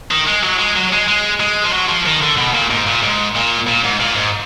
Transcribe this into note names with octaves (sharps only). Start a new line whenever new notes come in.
D#3
G#3
F#3
G#3
F#3
G#3
G#3
G#3
F3
F#3
F3
D#3
D3
B2
A#2
G#2
A#2
G#2
A#2
A#2
G#2
A#2
G#2